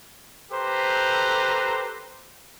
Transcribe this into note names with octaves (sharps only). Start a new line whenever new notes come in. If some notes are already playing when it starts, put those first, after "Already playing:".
G4 A4 B4 C5 A#5